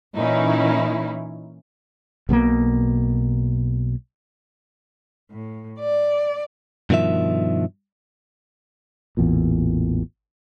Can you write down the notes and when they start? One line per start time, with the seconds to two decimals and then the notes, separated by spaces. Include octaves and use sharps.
0.16 A#2 E3 C#4 D#4 E4
2.29 B1 B2 F#3 A#3
5.31 A2
5.80 D5
6.90 G2 B2 D#3 F3 E5
9.17 A1 E2 A#2